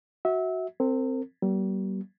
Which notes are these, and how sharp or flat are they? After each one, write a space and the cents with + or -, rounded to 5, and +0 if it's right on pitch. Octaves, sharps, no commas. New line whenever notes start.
F#4 +0 E5 -25
C4 +0 A#4 -40
G3 -40 A#3 +40